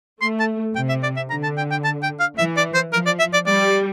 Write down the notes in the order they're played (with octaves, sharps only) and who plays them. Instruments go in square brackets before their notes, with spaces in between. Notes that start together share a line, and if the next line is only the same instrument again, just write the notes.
[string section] A3 [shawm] C6
[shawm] A5
[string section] C3 [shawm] G5
[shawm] E5
D5
E5
[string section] D3 [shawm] A#5
[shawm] A5
G5
G5
A5
G5
F5
[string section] E3 [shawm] E5
[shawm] D5
C5
[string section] F3 [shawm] A#4
[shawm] D5
E5
D5
[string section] G3 [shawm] D5